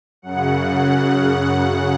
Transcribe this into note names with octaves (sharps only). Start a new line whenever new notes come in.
F#2 C#3 F#5
F#5